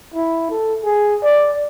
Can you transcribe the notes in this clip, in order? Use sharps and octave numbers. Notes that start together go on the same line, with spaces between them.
E4
A4
G#4
D5